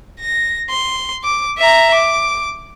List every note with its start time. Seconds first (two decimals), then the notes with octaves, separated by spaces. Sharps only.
0.20 A#6
0.69 C6
1.24 D6
1.58 E5 A#5
1.94 D6